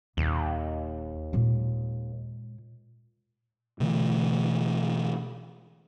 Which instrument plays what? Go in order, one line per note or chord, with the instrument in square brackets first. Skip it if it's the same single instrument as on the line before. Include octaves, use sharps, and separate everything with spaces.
[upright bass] D#1 [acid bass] D#2
[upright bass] A#2 G#3
[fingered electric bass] B2 D3 E3 A3